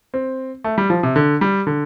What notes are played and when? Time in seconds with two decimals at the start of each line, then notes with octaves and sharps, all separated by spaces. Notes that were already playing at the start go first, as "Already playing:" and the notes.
0.14 C4
0.64 A3
0.78 G3
0.90 F3
1.03 C3
1.16 D3
1.41 G3
1.67 D3